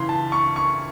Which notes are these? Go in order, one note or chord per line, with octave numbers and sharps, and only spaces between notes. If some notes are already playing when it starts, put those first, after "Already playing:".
Already playing: C#3 E3 C6
A5
C#6
C#6